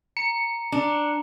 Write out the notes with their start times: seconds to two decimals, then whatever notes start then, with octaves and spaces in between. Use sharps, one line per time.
0.17 A#5 C#7
0.72 D4 A5 A#5